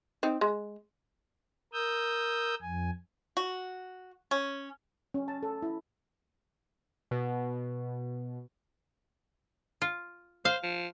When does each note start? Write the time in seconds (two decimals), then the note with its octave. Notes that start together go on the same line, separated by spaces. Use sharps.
0.23 C4 D#4
0.41 G#3
1.73 A#4 D#6 E6 G6
2.62 F2 G#5
3.37 F#4
4.31 C#4
5.14 C#4
5.28 A5
5.43 A4
5.62 E4
7.11 B2
9.82 F4
10.45 C5 F5
10.63 F3